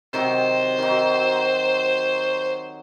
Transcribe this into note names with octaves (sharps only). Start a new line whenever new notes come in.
C3 D#3 F#3 C5
D#3 F#3